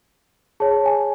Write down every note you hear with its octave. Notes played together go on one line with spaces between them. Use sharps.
G#4 C#5 A5
G#5